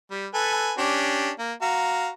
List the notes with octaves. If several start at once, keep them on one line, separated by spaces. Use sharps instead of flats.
G3
A4 B4 G#5
C#4 D4 G4
A#3
F#4 F5 A#5